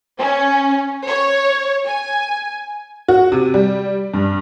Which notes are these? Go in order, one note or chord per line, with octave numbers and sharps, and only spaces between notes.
C#4
C#5
G#5
F#4
C3
G3
G2